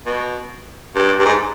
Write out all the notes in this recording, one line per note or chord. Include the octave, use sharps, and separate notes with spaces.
B2
G2
G2
G#2